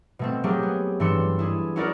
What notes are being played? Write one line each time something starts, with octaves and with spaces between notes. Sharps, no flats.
B2 A3 C4
F#3 A3 A#3 G4 G#4
B3
G2 E3 D4 C6 E6 C#7
E4 G#4
C#4 E4 F#4 G#4 A#4 D5